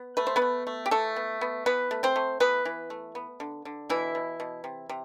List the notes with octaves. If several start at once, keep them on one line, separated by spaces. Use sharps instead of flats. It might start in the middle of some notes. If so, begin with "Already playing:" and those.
Already playing: B3
A3 B4
C5
B3 B4
A3
A3
G4
E3 A3 A4
B3
B3
E3 B3 B4
A3
C4 C5
A3
E3 B3 B4
E3
A3
B3
D3
D3
B2 E3 E4
B2
B2
C3
C3